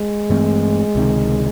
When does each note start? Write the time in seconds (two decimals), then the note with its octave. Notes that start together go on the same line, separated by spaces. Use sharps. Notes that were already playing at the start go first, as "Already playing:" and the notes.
Already playing: G#3
0.30 G2 E3 A3 C4
0.95 C#2 C3 D#3